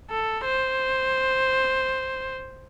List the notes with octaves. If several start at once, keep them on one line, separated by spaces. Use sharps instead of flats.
A4
C5